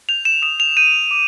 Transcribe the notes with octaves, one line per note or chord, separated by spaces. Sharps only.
G6 F7
E7
D#6 E7
F7
G6 D#7
D6